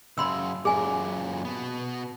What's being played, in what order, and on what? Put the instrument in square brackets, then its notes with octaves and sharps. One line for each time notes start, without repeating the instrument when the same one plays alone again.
[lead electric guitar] F#2 C#3 [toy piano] B5 C6 E6
[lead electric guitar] F#2 A#2 [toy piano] G#4 G#5
[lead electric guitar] B2 B3